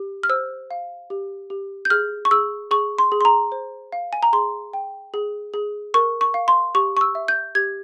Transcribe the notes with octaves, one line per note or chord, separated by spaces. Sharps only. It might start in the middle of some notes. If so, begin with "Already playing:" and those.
Already playing: G4
F6
C5 E6
F5
G4
G4
G6
G#4 F6
C#6
G#4 E6
G#4 C#6
C6
G#4
C6
A#5
C5
F5
G#5
A#5
G#4 C6
G5
G#4
G#4
A#4 C#6
C#6
F5
C6
G4 C#6
C#6
E6
E5
G6
G4 G#6